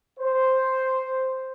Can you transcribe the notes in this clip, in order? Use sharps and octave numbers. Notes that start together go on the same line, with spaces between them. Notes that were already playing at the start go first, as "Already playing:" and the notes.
C5